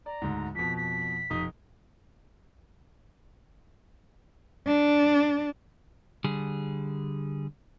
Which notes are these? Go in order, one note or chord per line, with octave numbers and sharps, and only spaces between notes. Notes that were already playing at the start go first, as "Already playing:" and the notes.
D5 A#5
D2 G#2
F2 B2 B6
B6
F1 D#4 D#6
D4
D3 G3 G#4